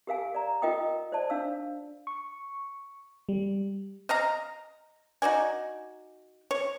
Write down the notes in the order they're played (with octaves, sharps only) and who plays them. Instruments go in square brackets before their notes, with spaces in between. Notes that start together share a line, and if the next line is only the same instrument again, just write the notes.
[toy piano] G4 A#4 F5 G#5
D5 A#5
F4 A#4 D#5 F#5 G5 D#6
C5 D5 A5
D4 F5 E6
[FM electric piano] C#6
G3
[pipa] D#5 F5 A#5
D#4 F#4 D5 G#5
C#5